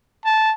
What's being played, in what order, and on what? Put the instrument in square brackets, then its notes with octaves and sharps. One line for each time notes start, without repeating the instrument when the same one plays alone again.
[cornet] A5